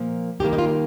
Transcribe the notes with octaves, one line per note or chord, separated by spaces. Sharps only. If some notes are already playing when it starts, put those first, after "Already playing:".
Already playing: A#2 F3 A#3
D#2 D#3 G3 A#3 G4
D#4
F4